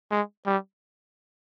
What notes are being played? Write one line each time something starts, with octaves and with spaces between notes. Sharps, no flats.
G#3
G3